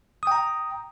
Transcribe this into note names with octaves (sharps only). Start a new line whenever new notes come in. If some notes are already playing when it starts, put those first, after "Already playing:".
G5 A#5 D#6